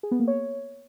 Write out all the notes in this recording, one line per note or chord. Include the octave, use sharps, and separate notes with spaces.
G#4
B3
A#3
C#5